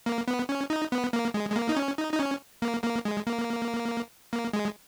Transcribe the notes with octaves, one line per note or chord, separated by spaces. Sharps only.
A#3
B3
C#4
D#4
B3
A#3
G#3
G#3
A#3
D#4
C#4
D#4
D#4
C#4
A#3
A#3
G#3
A#3
A#3
G#3